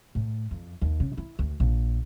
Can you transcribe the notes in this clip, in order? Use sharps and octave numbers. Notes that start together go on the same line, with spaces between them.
A2
F2
D#2
C#3
E4
D2
A#1